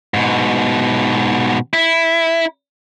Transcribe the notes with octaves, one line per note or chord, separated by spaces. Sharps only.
G#2 B2
E4